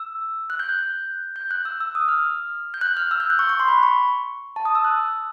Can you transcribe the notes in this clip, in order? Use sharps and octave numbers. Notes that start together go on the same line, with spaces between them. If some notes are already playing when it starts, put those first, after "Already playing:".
Already playing: E6
F#6
G6
F#6
G6
G6
F#6
E6
E6
D#6
F6
G6
F#6
F6
E6
G6
F#6
C#6
C#6
C6
B5
C#6
A5
D#6
E6
F#6